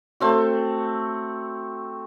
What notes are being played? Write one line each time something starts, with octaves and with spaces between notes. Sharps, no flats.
A3 C4 F#4